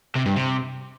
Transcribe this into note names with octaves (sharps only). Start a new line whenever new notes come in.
C3
G2
C3